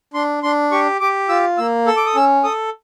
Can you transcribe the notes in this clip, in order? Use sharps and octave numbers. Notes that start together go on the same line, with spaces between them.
D4 C6
D4 C6
G4 C#6
G4 D6
F4 E6
A#3 E6
A4 E6
D6
D#6
C#4 E6
A4 D#6